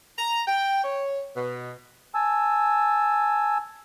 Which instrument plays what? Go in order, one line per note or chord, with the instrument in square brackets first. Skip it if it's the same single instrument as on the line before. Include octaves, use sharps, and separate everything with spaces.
[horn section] A#5
G5
C#5
B2
[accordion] G#5 A5 E6